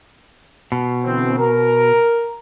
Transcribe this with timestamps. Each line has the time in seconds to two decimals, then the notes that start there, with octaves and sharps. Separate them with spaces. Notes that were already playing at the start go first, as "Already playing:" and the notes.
0.72 B2
1.04 D3 E3 C4
1.38 A#4